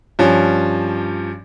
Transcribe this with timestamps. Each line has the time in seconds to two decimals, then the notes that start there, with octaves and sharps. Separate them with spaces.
0.19 G2 F3 C#4